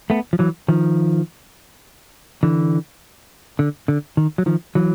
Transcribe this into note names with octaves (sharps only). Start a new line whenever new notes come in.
A3 B3
F3
E3 F#3
D#3 F3
D3 E3
D3
D3
D#3
F#3
D#3 F3
E3 F#3